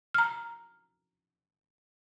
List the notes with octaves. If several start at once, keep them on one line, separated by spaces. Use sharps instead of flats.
A#5 F6